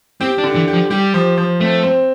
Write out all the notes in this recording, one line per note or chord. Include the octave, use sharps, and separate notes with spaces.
C4 G4
D4
D3
E3
G4
F3
G3 G4
F3
F3
A3 C4
C4